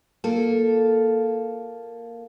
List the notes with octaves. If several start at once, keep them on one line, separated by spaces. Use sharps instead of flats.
A#3 F4 A4